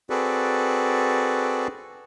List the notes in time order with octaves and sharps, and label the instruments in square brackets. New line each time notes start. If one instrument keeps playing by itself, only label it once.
[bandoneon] C4 F#4 G#4 A4 B4 D5